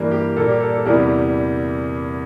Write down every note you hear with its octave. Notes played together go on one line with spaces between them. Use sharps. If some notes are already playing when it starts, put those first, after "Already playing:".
Already playing: G2 E3 G3 A#3
G4
A#2 G3 A#3 A4
G4
A4
A4
E2 C3 E3 G3 A#4
G4